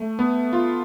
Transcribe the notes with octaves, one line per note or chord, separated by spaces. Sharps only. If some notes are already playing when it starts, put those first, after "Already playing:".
Already playing: A3
B3
F4